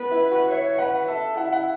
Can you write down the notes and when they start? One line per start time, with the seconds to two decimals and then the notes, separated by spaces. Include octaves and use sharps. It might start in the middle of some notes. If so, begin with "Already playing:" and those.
Already playing: B3 B4
0.11 E4
0.31 F#4
0.50 C#5 E5
0.78 B4 F#5
1.08 A4 E5
1.37 E4 F#5
1.45 E5
1.53 F#5